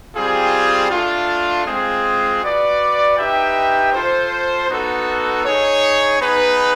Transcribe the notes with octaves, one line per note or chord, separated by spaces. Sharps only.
G3 C4 F4 G#4
A3 D4 F4
G#3 C4 F4 G#4
F#4 B4 D5
D#4 G4 B4 E5 G5
F4 A4 C5
B3 D#4 F#4 A4
D#4 G#4 C#5
B3 D#4 G#4 B4